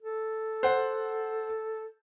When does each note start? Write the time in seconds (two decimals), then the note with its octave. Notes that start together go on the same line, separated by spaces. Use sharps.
0.02 A4
0.63 C5 F#5